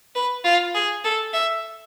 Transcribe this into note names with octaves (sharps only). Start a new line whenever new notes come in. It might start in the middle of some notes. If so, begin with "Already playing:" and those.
B4
F4
G#4
A4
E5